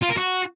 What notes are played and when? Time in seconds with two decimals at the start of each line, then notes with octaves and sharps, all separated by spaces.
0.02 F4
0.09 A#4
0.17 F#4